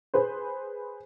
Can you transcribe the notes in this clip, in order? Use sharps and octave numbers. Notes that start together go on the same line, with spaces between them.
G#4 B4 C5